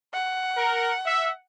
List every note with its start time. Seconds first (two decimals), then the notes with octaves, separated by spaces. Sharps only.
0.14 F#5
0.57 A#4
1.05 E5